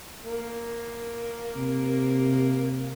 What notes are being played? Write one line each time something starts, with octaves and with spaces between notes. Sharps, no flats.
A#3
C3